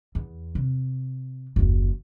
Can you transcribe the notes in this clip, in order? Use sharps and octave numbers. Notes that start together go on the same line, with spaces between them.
E2
C3
F#1 D#2